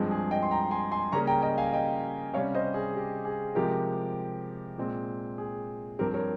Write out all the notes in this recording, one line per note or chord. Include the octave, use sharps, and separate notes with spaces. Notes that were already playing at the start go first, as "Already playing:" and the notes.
Already playing: G2 F3 G#3 C4
G#4
D#5 G5
C6
G5 A#5
G#5 C6
G#5 C6
C#3 G3 A#3 C#4 A#5 C#6
G5 A#5
D#5 G5
F5 G#5
D#5 G5
C3 G3 C#4 C#5 F5
C5 D#5
G#4
G4
G#4
C3 F3 G#3 G4 A#4
A#2 G#3 C4
G#4
G2 F3 C4 G4 A#4
A#4 C#5